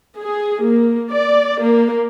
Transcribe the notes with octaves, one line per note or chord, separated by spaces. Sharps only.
G#4
A#3
D5
A#3